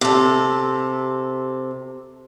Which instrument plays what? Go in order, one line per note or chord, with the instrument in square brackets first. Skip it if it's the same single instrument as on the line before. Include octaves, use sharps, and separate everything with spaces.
[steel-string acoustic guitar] C3 A4